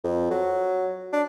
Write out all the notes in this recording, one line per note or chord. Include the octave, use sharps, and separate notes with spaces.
F2
F#3
D4